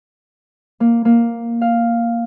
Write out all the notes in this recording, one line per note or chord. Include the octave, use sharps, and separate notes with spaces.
A#3
A#3
F5